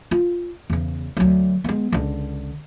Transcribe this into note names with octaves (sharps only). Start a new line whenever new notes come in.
F4
E2 C#3
D2 F#3
G#3 B3
C#2 D3